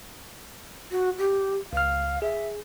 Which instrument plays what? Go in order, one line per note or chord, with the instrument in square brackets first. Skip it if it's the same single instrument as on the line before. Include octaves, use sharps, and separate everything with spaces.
[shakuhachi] F#4
G4
[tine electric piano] C#2 F6 [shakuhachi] F5
[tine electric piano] G#4 [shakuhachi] E5